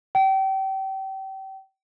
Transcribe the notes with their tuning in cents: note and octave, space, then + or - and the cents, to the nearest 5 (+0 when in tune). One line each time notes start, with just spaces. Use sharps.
G5 -30